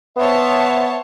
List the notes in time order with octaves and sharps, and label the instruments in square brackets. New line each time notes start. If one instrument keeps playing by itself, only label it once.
[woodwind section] B3 E5 [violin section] C5 C#5 A5